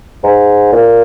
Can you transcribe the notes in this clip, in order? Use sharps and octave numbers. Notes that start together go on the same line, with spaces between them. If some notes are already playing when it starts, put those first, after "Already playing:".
G#2
A#2